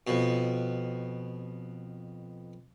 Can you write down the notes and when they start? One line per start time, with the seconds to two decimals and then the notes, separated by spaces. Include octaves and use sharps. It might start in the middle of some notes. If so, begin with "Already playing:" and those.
0.07 F2 B2